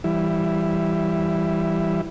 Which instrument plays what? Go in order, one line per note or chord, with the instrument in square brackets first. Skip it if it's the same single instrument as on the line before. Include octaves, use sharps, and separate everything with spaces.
[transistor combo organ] E3 G3 E4